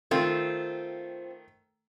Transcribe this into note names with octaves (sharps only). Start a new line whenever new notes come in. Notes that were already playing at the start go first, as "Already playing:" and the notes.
D#3 A3 C4 F4